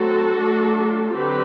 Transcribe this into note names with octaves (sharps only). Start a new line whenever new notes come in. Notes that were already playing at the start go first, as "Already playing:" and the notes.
Already playing: F#3 A3 C4 F#4 A4
F#3 A3 D4
D3 F#3 C4 G4 B4